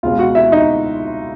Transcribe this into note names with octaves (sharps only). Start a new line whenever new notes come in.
C#2 B2 G#3 C#4 F4 F5
F#4 F#5
E4 E5
D#4 D#5